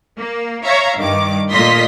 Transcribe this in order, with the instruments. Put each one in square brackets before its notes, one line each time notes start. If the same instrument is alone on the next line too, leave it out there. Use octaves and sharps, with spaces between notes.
[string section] A#3
C#5 E5 F5 A#5
G2 D#3 D6
A#2 A3 F4 D#5 C6 B6